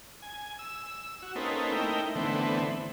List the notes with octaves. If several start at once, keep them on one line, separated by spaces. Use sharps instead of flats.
G#5
E6
F#4
A#3 C4 C#4 D#4 A4 B4
A3 D#4 E4 A#4 G5
D3 E3 A3 B3 C4